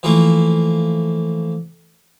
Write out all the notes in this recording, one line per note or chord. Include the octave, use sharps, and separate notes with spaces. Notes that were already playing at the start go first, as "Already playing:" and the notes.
E3 F3 A3 A#3